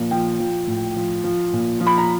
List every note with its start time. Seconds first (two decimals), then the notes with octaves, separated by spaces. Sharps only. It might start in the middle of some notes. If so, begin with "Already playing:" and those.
Already playing: A#2 F3
0.11 F3 G5
0.39 F3
0.67 A2
0.96 F3
1.24 F3
1.53 A#2
1.80 F3
1.87 B5
1.98 A#5